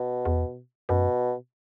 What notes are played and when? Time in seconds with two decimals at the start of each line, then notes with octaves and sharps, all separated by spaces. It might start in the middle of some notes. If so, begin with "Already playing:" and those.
Already playing: B2
0.25 E2
0.89 F#2 B2